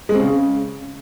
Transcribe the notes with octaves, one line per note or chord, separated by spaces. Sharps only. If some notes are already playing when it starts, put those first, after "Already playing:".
G#3
C4
C#3